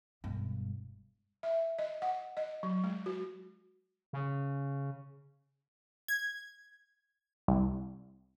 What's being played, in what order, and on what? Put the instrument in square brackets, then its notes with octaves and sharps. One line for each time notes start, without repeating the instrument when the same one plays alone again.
[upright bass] E1 G2
[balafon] E5
D#5
F#5
D#5
F#3
G#3
F#4
[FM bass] C#3
[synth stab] G#6
C2